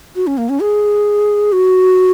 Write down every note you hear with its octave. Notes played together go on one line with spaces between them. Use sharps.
F#4
C#4
A#3
C#4
G#4
F#4